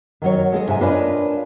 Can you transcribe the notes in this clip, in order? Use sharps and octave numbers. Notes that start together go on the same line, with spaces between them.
D#3 F#3 C#5
G#3 A4 D#5
G#2 C3 E5 G#5
D4 F4 A#4 B4 C#5 D#5